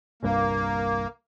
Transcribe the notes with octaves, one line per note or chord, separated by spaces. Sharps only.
G1 C2 G2 A#3